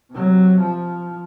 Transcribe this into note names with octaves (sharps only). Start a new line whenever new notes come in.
C3 F#3
F3